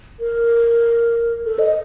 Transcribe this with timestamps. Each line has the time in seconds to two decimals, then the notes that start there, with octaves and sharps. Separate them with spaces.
0.20 A#4
1.46 A4
1.59 D#5